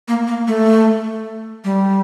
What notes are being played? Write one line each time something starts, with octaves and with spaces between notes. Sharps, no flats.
A#3
A#3
A3
G3